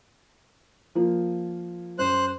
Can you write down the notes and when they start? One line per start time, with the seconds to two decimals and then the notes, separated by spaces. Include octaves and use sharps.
0.95 F3 A#3 F4
1.99 F#2 C5 F#6